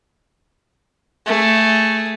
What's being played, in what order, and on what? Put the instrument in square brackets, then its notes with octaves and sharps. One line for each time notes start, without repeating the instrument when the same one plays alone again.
[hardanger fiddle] A3 G#4